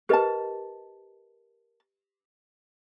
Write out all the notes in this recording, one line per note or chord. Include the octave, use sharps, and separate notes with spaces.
G4 A#4 B4 D#5 A5